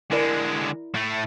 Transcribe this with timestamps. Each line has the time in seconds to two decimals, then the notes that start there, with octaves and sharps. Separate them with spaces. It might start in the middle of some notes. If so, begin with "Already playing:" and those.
0.11 D3 G#3 E4 A#4 D5
0.94 A2 A3